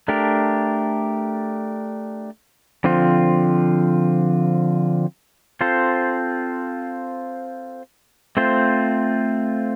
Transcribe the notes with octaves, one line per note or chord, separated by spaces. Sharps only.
A3 D4 G4 A#4
D3 F3 C4 F4
C4 F4 A4 C5
A3 C4 F4 C5